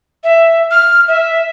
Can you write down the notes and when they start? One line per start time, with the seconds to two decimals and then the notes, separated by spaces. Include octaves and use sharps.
0.24 E5
0.71 F6
1.08 E5